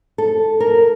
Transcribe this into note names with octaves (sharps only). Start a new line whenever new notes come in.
A4
A#4